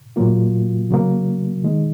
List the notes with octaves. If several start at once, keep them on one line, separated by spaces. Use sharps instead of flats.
A#2 F#3 A#3 F4
C#3 F#3 A#3
D#3 G#3 D#4